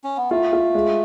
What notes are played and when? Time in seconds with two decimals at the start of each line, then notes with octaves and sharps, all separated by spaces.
0.04 C#4
0.17 B3
0.31 A3 F4
0.53 F4
0.74 G#3